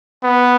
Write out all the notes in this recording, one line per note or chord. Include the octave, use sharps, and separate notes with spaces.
B3